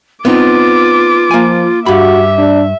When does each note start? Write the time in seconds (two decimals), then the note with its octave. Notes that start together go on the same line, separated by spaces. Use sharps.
0.25 B3 C4 D#4 F4 D6
1.31 F3 A#3 G#5
1.86 G2 F#4 G4 E5 B5
2.38 D4